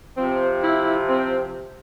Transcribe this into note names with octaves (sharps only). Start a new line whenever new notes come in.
C3 F3 C4
E4
C4